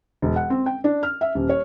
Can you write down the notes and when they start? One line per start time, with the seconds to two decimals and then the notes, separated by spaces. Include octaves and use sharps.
0.22 E1
0.36 F#5
0.50 C4
0.66 G5
0.84 D4
1.03 F6
1.21 E5
1.35 D#1
1.49 C#5